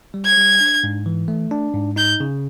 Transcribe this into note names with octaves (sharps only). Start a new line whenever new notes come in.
G3
G#6
G3
D4
G#2
E3
A3
D4
G#2
D#4 G6
C#3